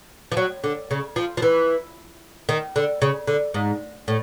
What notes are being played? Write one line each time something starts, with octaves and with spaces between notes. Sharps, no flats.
F3
F#3
D3
C#3
F3
F3
E3
D#3
D3
C#3
D3
G#2
A2